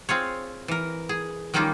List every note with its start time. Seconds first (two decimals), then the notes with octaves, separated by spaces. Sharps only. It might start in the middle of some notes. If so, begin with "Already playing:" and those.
0.09 C4 F4 G#4 C#5
0.68 E3 A#4
1.09 G#4
1.54 D#3 G3 A#3 C#4 D#4 F4